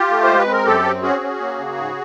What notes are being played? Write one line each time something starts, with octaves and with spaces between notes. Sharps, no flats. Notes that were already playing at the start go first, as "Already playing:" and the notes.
Already playing: F4 G4
A3
G#3 C5
B4
C4
A#4
F#2 G4 A4
C4
C#4 F#4 G#4
C#4
A#3
C#3
G#2